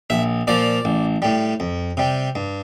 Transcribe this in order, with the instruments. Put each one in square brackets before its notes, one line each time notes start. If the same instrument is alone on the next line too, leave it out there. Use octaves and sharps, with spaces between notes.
[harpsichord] A#1 E5
A#2 F3 D5
A1
A2 G3
F2
C3 G3
G2